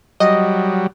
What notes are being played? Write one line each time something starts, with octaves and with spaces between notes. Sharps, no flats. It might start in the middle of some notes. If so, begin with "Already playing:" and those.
F#3 G3 D#5